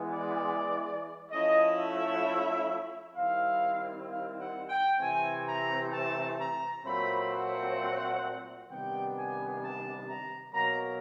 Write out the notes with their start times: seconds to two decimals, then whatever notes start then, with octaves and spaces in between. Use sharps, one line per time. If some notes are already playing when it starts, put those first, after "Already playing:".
Already playing: E3 G#3 B3
0.08 D5
1.30 F3 A3 C#4 E4 D#5
1.76 E5
3.15 D#3 G3 C4 E4 F5
4.08 F5
4.38 F#5
4.69 G5
4.99 C3 E3 A3 C4 G#5
5.46 A#5
5.92 A5
6.39 A#5
6.84 A#2 F#3 A3 C4 B5
7.30 F#5
8.69 C3 D#3 G3 B3 D4 G5
9.15 G#5
9.62 A5
10.07 A#5
10.54 B2 F#3 A#3 A#5